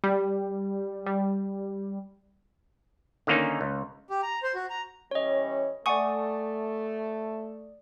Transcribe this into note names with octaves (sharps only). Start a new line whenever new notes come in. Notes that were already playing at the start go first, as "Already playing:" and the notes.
G3
G3
D3 D#3 A#3 C#4 D#4
C#2
G4
A#5
C5
F#4
A#5
E3 G3 C#4 C#5 D#5
A3 D5 F#5 G#5 C#6 D#6